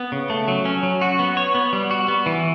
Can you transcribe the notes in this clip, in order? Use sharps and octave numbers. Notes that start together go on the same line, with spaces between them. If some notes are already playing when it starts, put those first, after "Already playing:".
Already playing: B3
C#3
A3
F#3
C#4
F#3
F#4
B3
C#5
B3
G3
F#4
B3
E3